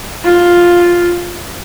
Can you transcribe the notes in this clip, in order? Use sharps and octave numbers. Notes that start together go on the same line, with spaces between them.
F4